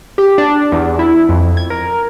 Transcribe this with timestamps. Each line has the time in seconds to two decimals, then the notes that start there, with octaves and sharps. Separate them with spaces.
0.18 G4
0.38 D4
0.72 E2
0.99 E4
1.29 F2
1.57 G#6
1.70 A#4